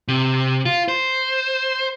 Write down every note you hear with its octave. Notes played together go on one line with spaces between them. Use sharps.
C3
F4
C5